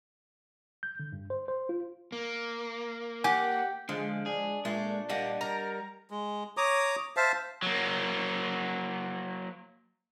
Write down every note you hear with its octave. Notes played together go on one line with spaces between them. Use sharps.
G6
D3
G2
C5
C5
F4
A#3
G4 F#5 G#5
D3 F3 G#3
D4 G#4
A#2 G#3 A3
G3 A#3 G4 D#5 F#5
A#4 A#5
G#3
C#5 A#5 D6 D#6
C5 E5 F5 A5
F#3 A#3